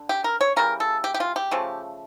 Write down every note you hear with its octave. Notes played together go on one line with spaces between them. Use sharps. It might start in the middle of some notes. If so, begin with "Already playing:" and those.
Already playing: D3
G4
A#4
C#5
C#3 E3 G3 A#4
A4
G4
G4
F4
G4
C#3 F3 A3